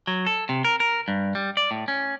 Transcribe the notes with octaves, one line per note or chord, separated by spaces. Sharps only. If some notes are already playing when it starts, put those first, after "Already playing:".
F#3
A4
C3
A#4
A#4
G2
G3
D5
A2
C#4